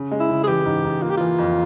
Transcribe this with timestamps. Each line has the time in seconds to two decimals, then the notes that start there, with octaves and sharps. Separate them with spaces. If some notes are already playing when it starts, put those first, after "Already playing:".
Already playing: C#3
0.11 G#3
0.20 E4
0.30 C#3
0.43 G#4
0.48 E3 G4
0.65 G#2
0.84 G#2
1.02 A#3 F4
1.10 G4
1.17 E3 F4
1.38 F2